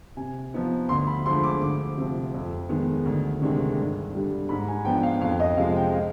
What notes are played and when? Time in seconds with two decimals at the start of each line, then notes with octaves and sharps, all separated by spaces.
0.17 C3 G#5
0.54 F3 B3 D#4
0.89 D2 C6
1.07 B5
1.26 D3 F3 G#3 C6
1.43 D6
1.61 D2 D6
1.98 C3 F3
2.34 F2
2.69 D#3 G#3 B3
3.05 D2
3.42 C3 D#3 G#3 D4
3.77 G2
4.13 D3 G3 D4
4.49 G#2 B5
4.68 G#5
4.85 F3 B3 D4 G5
5.03 F5
5.21 F2 F5
5.40 D#5
5.57 C3 F3 G#3 F5
5.76 G5
5.93 F5